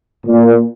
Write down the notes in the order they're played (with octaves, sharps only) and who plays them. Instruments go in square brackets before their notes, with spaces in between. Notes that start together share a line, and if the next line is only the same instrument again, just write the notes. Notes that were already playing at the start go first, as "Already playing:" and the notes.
[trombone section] A#2